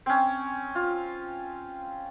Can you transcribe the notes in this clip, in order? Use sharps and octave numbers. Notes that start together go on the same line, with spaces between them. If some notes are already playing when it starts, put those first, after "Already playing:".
C4 C#4
F4